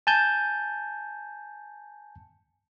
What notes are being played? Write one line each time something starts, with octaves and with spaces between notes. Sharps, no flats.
G#5 A5 G6